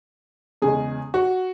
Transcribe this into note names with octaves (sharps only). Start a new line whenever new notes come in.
E2 C#3 G#3 G#4
F#4